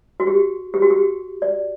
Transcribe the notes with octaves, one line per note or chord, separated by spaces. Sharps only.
F#4
G4
G4
F#4
G4
D5